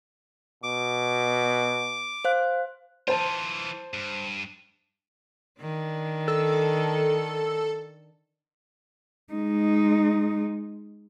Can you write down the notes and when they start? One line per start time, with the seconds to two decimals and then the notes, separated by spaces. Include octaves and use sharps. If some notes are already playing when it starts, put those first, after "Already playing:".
0.63 B2 D6
2.25 C5 F5 F#6
3.08 E3 F4 C5 A5
3.94 G2
5.60 D#3 D4
6.28 A4
9.33 G#3 D#4